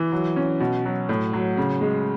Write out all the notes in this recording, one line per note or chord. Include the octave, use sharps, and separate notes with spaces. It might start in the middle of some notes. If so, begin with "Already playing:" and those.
Already playing: E3
F#3
C#4
B2
F#3
A2
F#3
C#3
G#3